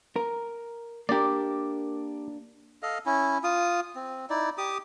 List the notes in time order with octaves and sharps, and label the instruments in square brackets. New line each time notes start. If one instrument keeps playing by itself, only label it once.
[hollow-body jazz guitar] A#4
[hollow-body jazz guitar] A#3 D4 A#4 [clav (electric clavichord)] G4 D5
[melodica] A4 D#5 F5
C#4 E4
F4 D#6
C4
D#4 E4 D5
G4 D6 D#6